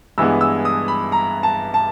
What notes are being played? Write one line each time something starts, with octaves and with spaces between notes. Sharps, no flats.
G2 E3 G#3 B3 E6
E6
D#6
B5
A#5
A5
A5